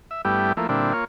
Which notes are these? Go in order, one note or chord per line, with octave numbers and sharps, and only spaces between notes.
E5
G2 G3 A3 B3 E4 G4
F3 A3 A#3 E4
A#2 D3 G3 C4 D4 E4
A#3 F4 C#5